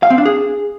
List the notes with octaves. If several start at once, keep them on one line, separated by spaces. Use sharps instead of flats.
F5
C4
D4
G#4